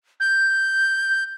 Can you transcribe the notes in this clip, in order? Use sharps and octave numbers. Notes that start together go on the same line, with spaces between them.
G6